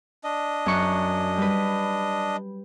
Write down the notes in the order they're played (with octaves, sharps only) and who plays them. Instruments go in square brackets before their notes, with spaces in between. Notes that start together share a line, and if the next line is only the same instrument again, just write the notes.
[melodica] D4 D#5
[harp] F#2 C#6 F#6
G3 B4